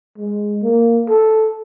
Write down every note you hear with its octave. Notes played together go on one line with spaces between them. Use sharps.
G#3
A#3
A4